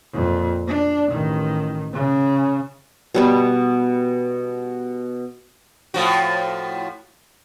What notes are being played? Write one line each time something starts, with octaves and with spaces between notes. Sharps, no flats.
F2 A#2
D4
A1 D#3
C#3
B2 G3 B3
A2 F3 F#4